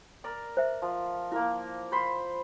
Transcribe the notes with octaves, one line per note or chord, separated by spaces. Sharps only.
A#4 D5
C5 E5
F3
A#3 E4 A#4
C5 B5 C6